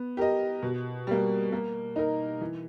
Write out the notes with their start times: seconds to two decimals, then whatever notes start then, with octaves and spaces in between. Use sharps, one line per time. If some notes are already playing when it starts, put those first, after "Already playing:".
Already playing: B3
0.17 G4 A#4 D#5
0.63 B2
1.07 G3 A#3
1.52 A#3
1.96 D#4 A#4
2.41 E3